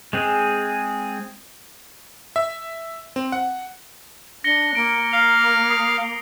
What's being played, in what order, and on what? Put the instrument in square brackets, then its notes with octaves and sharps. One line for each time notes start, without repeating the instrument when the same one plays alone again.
[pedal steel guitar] G#3 C4 G#4
[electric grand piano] E5
C4
F#5
[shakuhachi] D4 [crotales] A#6 C#7 G7
[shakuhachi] A#3 [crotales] D7
[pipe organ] F5
[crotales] D#6 C7